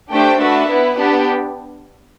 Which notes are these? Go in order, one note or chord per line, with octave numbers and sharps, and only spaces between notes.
A3 D4 G4 C5 G5
A3 D4 F#4 B4 E5
B3 E4 B4
B3 D4 G4